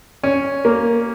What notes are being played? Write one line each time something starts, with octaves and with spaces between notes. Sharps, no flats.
C#4
A#3